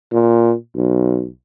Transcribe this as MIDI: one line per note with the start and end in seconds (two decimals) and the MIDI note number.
0.12 0.55 46
0.76 1.27 35